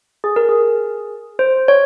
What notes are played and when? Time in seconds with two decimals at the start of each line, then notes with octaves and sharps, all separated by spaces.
0.24 G#4
0.36 A#4
0.49 G#4
1.39 C5
1.68 C#5